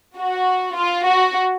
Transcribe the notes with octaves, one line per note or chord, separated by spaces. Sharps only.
F#4
F4
F#4